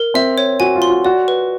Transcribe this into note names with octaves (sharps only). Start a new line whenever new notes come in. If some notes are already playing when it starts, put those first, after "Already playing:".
Already playing: A#4
C4 E5
C#5
F#4 G#5
F4
C6
F#4
F#4 D5
B4